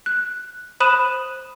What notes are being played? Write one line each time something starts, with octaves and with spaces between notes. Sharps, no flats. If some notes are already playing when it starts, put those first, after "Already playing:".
F#6
C5 B5 D#6 F#6 D#7 E7